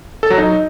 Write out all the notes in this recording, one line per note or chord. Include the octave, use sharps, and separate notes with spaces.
A4
F#3
D#4